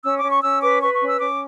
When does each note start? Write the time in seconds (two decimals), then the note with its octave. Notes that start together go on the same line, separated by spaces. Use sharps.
0.04 C#4 E6
0.17 D6
0.24 C#4
0.30 C#6
0.43 C#4 E6
0.61 B4 D6
0.81 B4 C#6
0.94 C#6
1.01 C#4
1.06 E6
1.19 C#4 D6